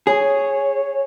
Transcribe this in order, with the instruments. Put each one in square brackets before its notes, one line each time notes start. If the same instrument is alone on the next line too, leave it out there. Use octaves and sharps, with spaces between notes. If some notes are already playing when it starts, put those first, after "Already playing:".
[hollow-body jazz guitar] G#4 [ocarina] C#5